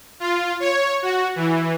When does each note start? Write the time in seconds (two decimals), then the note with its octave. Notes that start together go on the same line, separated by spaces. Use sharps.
0.20 F4
0.60 C#5
1.02 F#4
1.36 E3